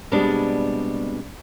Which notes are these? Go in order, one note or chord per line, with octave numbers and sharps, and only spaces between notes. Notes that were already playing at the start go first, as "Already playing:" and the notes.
B2 G3 G#3 B3 C4 D4